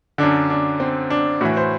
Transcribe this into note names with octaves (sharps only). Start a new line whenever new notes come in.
F#2 D3 D4
D4
C4
D4
A2 E3 F#4
C5